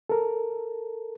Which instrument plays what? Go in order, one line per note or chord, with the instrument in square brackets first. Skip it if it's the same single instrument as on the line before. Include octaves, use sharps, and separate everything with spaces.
[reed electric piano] A4 A#4